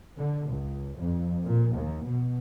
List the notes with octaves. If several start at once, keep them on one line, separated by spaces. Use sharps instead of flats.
D3
C#2
F2
A#2
D#2
B2